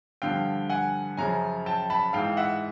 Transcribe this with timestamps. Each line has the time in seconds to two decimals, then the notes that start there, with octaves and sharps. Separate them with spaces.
0.22 G2 D3 F3 F5 G5
0.70 F#5 G#5
1.17 F#2 C#3 F3 G#5 A#5
1.66 G5 A5
1.90 A5 B5
2.13 G#2 E3 F5 G5
2.37 E5 F#5